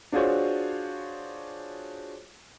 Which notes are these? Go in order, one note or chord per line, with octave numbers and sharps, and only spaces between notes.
D4 F4 F#4 G#4 C5 C#5